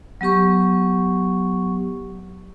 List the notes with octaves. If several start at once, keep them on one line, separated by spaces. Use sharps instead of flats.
F#3 B3 G4 C#6